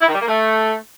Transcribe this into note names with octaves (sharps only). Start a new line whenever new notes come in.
E4
D#3
G3
A#3
A3